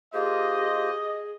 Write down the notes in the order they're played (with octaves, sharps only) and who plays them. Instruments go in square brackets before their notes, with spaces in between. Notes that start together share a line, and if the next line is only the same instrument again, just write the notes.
[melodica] A#3 F4 C5 [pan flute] G4 [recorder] G#4 [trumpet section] D#5